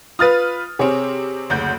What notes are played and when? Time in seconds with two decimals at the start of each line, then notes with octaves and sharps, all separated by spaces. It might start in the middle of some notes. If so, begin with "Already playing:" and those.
0.19 F4 B4 D#6 F6 A6
0.79 C3 C4 G#4 C#5
1.50 F#1 D2 G6